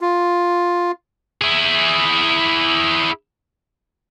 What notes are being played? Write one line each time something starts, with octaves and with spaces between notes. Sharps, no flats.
F4
E4 G#4